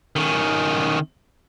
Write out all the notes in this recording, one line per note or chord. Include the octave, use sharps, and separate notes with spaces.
D#3 C#4